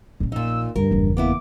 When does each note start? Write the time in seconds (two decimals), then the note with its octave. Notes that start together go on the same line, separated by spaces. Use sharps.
0.20 A#1 C#4
0.32 A#2 D#4 E6
0.76 D2 G2 A#4
0.91 F#1 E2
1.17 A#3 B3 E4 D6